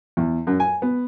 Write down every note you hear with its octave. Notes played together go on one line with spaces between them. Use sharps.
E2
F#2
G#5
B3